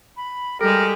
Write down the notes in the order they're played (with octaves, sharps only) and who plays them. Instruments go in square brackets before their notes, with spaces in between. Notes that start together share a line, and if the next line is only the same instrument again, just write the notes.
[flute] B5
[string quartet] G3 G#3 [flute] G4 [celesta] A4 [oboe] A#4